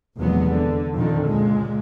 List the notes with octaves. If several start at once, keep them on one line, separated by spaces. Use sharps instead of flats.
F1 E2 A#2 F#3 G#3 B3
D3
F2 A#2 D3 D#3
C#2 A#2 G#3